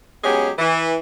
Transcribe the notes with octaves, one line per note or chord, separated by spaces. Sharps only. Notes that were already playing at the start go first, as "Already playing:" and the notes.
F#3 G#3 B3 C#4 G4 G#4
E3